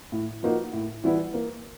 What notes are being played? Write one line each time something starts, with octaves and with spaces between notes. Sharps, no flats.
A2
F3 A#3 D#4 F#4
A2
E3 G3 B3 E4
A#3